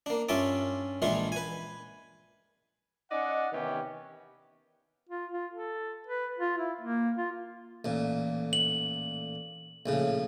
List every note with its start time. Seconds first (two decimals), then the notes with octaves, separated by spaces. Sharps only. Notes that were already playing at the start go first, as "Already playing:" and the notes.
0.06 A#3 D4
0.29 G2 C#4 F4 E5 A5 D6
1.02 A#1 E3 G#3 A3 D4 F4
1.32 B4 G#5
3.10 C#4 D#4 D5 D#5 F#5
3.52 C3 D#3 E3 B3 C#4 G4
5.09 F4
5.32 F4
5.53 A4
6.07 B4
6.39 F4
6.58 E4
6.81 A#3
7.18 F4
7.85 A1 A#2
8.53 F#7
9.86 A#1 A2 C#3